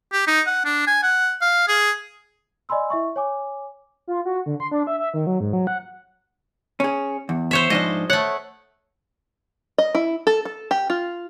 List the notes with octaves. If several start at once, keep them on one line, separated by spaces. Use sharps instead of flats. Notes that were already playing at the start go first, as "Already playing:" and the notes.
G4
D#4
F#5
D4
G#5
F#5
F5
G#4
D5 D#5 G#5 B5 C6 E6
E4 E5 C#6
C#5 G#5 D6
F4
F#4
D3
C6
D4
E5
E5
D#3
F#3
G#2
F#3
F#5
C#4 G#4
E2
C5 C#5 E5
G#2 F3 D4 D#5
A3 C#5 F#5
D#5
E4
A4
A4
G4
F4